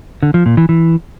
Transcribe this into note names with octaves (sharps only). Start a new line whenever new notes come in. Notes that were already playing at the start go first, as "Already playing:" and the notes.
D3
F3
A#2
E3
E3